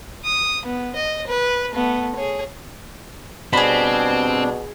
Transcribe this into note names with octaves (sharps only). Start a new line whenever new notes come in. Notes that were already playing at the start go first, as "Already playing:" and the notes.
D#6
B3
D#5
B4
A3 B3
G#4 C#5
B2 G3 C4 D4 G#4 B5